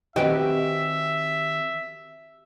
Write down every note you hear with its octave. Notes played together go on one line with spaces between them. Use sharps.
D#3 C4 F#4 G4 B4 D#5 E5 G#5